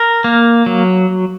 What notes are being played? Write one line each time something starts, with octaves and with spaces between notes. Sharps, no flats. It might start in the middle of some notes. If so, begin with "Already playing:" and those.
Already playing: A#4
A#3
F#3